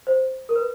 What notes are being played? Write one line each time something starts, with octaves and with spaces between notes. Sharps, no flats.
C5
A#4
B4